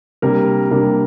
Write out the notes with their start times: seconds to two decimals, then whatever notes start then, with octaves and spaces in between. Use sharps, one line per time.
0.22 C3 G3 A#3 D4 A#4
0.71 C3 G3 A#3 D4